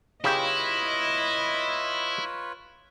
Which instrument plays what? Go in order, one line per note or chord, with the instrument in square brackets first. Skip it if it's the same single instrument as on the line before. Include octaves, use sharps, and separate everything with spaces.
[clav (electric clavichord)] C#3 G4 [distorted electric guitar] E4 [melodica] F4 B4 C#5 [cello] D#5